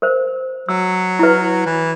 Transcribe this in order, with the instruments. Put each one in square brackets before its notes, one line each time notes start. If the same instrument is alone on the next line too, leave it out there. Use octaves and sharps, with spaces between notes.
[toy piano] A#4 C5
[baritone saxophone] F#3 [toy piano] E6
[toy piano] E4 B4
[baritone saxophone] E3